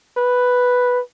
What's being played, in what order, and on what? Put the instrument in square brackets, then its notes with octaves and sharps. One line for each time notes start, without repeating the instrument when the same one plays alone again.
[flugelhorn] B4